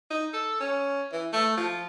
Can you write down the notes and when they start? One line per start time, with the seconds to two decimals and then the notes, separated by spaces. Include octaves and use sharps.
0.11 D#4
0.34 A4
0.60 C#4
1.12 E3
1.33 A3
1.57 F3